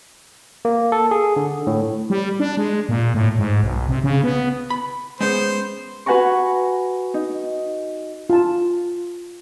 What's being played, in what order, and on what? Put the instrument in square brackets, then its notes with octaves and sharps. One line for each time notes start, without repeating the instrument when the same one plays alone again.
[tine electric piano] A#3
A4
G#4
D3
A2
[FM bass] G3
D4
G#3
A#2
A2
G#2
B1
C3
C#3
B3
[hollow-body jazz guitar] B5
[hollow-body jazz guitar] G#3 B3 C#4 [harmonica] C5
[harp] F#4 B4 F#5 G#5 A#5 C#6
D#4
[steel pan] F4 A5